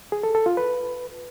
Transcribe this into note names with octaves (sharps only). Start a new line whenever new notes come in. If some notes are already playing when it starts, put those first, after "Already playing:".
G#4
A4
A4
F4
B4